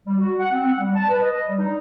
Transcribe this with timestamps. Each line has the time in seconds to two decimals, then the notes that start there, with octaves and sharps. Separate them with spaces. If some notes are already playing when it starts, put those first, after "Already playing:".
0.05 G3
0.18 F#4
0.39 F#5
0.52 C4
0.66 F#5
0.79 G3
0.94 A5
1.08 B4
1.21 D#5
1.45 G3
1.59 D#4